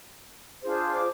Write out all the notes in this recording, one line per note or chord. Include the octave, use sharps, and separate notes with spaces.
D4 F4 G#4 C5
D6